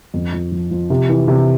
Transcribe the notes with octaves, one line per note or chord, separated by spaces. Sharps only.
F2
F3
F3
F3
C3
E3
C3